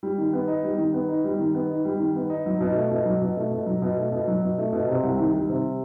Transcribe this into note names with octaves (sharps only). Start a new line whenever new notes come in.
G3
D#3
B3
D#4
G3
D#3
B3
D#4
G3
D#3
B3
D#4
G3
D#3
B3
D#4
F#3
B2
A3
B2
F#3
B2
A3
B2
F#3
B2
A3
B2
F#3
B2
A3
B2
C3
C2
D#3
G3
C3